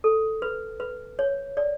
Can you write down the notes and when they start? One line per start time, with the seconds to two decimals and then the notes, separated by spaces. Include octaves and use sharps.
0.04 A4
0.42 B4
0.80 B4
1.19 C#5
1.57 D5